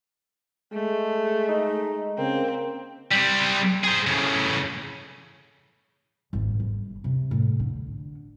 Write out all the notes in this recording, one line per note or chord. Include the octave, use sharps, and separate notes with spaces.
G#3 A3
D#4
C#3 A#3 C4
G3 C4
G#4 C5
A2 C#3
G#1
G1
C3
A2
D3